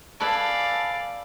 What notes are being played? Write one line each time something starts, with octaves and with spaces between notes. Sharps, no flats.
A4 B4 D5 F5 G#5